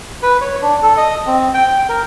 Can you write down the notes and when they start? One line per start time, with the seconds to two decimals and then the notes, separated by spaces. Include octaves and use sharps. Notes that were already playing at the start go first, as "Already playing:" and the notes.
0.23 B4
0.41 C#5
0.62 D4
0.83 A4
0.97 D#5
1.26 C4
1.54 G5
1.89 A#4